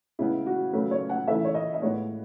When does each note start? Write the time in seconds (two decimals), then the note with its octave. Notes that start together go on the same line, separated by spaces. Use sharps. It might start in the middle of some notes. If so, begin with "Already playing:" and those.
0.19 C#3 G#3 B3 E4
0.46 F#4
0.73 C#3 F#3 A3 B4
0.91 C#5
1.09 F#5
1.27 C#3 E3 A3 E5
1.45 C#5
1.54 D#5
1.74 D#5
1.82 A2 G#3 B3 C#5